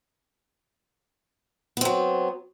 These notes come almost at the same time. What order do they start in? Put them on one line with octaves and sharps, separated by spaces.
B3 C4 F#3